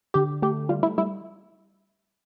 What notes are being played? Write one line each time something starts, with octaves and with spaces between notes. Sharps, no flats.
D3 G4
A3 G4
G3 F4
E4
G3 E4